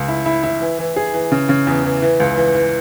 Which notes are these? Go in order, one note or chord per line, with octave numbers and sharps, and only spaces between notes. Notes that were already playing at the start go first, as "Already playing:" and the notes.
Already playing: C#2
E4
E4
E4
E3
E3
G#4
E3
C#3
C#3
E2
E3
E3
C#2
E3
E3